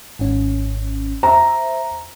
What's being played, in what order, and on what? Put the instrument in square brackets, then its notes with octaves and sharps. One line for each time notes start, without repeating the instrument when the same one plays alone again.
[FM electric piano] G#1 G#2 C#4
[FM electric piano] C5 E5 [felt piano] A#5